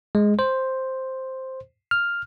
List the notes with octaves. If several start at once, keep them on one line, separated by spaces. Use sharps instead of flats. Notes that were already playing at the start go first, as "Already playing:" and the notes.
G#3
C5
F6